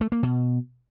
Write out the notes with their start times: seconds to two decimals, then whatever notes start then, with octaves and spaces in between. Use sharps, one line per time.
0.01 A3
0.12 A#3
0.23 B2